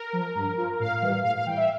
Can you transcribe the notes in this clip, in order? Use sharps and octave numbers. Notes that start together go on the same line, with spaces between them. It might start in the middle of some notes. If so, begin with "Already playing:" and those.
Already playing: A#4
F3
G2
F3
A2 F5
E3 G3
A2 F5
F5
E3 G3 G5
E5